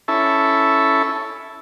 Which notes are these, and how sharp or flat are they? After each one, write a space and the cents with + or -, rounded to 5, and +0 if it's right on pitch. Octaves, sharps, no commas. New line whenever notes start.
C#4 +0 E4 +0 A4 +0